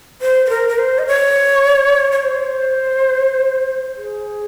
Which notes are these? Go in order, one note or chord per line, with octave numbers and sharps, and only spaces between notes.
C5
C5
A#4
A#4
C5
D#5
C#5
C#5
C5
G#4